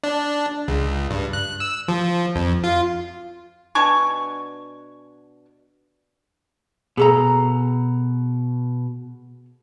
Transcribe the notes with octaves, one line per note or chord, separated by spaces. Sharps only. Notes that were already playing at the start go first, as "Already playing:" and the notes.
D4
C#2
G2
F#6
E6
F3
F2
F4
B2 D4 G#5 C#6
B2 G#4 A4 A#5